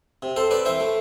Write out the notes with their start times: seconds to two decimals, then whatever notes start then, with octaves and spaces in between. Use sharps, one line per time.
0.22 C3
0.36 C4 A4 C5
0.50 C4 B4 D5
0.65 E3 C5 E5
0.80 A3